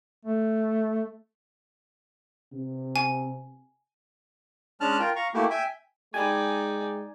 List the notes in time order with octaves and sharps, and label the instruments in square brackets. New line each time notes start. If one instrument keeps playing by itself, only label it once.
[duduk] A3
[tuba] C3
[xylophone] G#5
[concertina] G#3 C#4 D4 A5 F6 F#6
F4 A#4 G5
F5 A#5 C#6
A3 A#3 E4 F#4 G4
E5 G5 G#5
[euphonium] G#3 [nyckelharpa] D#4 D5 [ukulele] G4 B5 [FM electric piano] G#5